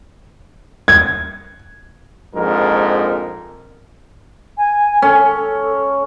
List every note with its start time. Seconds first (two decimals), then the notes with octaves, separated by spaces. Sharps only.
0.88 G#6
2.34 A#1 F2 G#2 A#4
4.57 G#5
5.02 C#4 A4
5.24 A4